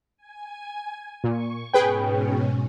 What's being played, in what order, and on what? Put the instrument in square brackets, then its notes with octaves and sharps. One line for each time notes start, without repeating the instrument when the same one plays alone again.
[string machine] G#5
[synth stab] A#2 [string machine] C#6
[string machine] G#2 B2 C#4 [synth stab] G#4 B4 G5